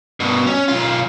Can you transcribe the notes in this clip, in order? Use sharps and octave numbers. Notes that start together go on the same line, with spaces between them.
G2 B2
C#4
B1 F4